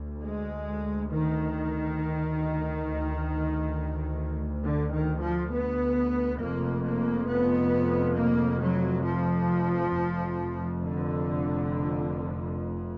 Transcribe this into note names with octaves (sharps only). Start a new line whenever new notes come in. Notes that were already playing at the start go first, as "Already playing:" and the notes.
Already playing: D2
G#3
D#3
D2
D3
D#3
F3
B3
F1 F2 A#3
A#3
B3
A#3
F#3
F3
F1 F2
D3